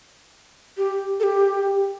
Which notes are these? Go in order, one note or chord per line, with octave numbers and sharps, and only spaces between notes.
G4
A4
G4